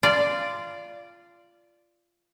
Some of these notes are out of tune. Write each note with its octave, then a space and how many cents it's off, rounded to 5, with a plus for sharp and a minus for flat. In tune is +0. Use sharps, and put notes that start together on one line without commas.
F4 -15 D5 +0